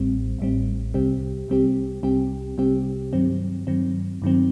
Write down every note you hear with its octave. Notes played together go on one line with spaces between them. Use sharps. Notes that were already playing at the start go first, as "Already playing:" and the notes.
Already playing: A1 A2 G3 C4
A1 A2 G3 C4
C2 C3 G3 C4 G4
C2 C3 G3 C4 G4
C2 C3 G3 C4 G4
C2 C3 G3 C4 G4
G2 D#3 F#3 C4
G2 D#3 F#3 C4
G2 D#3 F#3 C4